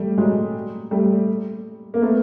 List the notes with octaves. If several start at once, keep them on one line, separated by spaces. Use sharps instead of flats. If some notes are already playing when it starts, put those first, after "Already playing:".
Already playing: G3 A3
F#3 G#3
G3 A3
A#3
A3 B3